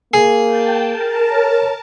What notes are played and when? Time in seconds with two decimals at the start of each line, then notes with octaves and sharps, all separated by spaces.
0.14 A#3 G#4
0.44 G5 A5
0.91 A#4 A5
1.32 C#5